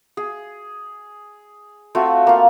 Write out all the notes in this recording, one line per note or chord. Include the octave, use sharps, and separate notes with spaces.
G#4
A3 C4 F4 F#4
A#3 F4